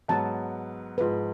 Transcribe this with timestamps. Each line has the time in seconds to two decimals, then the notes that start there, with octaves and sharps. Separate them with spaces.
0.08 G#2 F#3 B3 A5
0.98 G#2 F3 G#3 B4